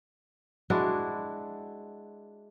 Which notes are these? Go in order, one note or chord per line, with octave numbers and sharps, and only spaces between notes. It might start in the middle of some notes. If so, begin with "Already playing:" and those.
G#3 D4 E4 F#4